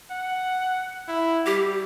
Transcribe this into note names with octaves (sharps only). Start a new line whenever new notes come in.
F#5
E4
G3 G4